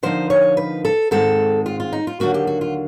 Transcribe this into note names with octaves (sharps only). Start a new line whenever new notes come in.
D3 F3 A#3 D#4 C5
C#5
B4
A4
G#2 D#3 G#3 C4 A4
F4
F4
D#4
F4
D#2 D3 F#3 A#3 F#4
G4
F#4
F4